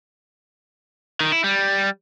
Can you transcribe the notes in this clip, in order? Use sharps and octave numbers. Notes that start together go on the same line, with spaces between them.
D#3
E4
G3